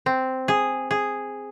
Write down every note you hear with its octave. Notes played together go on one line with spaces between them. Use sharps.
C4
G#4
G#4